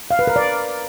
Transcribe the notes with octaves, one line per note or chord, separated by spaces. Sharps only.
F5
B4
A#4
D5